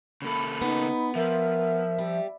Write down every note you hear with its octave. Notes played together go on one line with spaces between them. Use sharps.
C#3 A#3 A4 B5
B3 D#4
F3 A#4 E5
G3